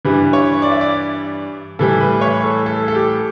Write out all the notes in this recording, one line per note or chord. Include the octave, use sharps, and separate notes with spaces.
G2 E3 G3 B4
C#5
D5
E5
D5
A2 E3 G3 A4
B4
C#5
A4
A4
A4
G4